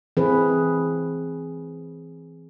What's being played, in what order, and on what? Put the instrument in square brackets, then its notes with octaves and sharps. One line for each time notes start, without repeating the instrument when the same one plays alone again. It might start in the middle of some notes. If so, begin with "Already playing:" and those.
[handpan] E3 C4 G#4 B4